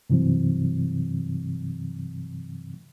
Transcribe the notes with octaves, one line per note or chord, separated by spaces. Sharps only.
G2 C3 E3 F#3 C4